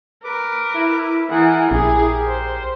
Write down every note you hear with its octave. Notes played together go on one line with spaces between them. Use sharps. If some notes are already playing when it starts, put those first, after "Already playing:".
A#4 B4 D6
E4
E3 G#4 A#4 F#5
A#1 G4 G#4 A#4
C5